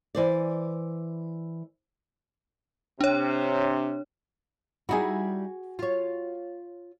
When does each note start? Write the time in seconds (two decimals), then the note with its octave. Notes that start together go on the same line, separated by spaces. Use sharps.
0.15 E3 C5 D5
3.01 C3 D4 C#5
4.89 G3 D#4 E4 F#4 G#4
5.79 F4 C#5